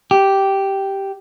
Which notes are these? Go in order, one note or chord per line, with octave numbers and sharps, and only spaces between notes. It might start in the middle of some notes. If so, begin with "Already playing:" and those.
G4